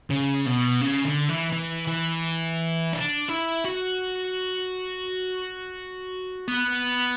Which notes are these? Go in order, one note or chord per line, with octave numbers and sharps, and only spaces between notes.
C#3
B2
C#3
D3
E3
E3
E3
D4
E4
F#4
B3